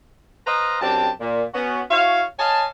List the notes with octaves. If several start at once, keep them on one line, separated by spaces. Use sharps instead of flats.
B4 C5 D#5 F5 A#5
F#2 C4 D4 G4 A5
A#2
B3 C#4 F#4
E4 F#4 C#5 F5
C#5 D#5 F5 G#5 A5